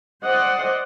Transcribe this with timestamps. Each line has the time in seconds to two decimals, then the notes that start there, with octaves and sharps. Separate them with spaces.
0.24 C5 D5 D#5 F#5